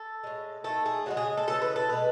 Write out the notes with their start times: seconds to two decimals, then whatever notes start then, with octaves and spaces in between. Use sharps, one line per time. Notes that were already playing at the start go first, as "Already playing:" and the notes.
Already playing: A4
0.23 A2 G#3
0.64 D#3 A3 A4
0.86 G#4
1.06 C#3 E3 G#3 F#4
1.17 G#4
1.37 A4
1.48 C#3 E3 G#3 A4
1.62 B4
1.76 A4
1.89 B2 G#3 B4